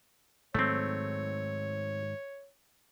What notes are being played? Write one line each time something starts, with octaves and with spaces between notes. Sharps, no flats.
G#2 D#3 F#3 A3 C4 C#5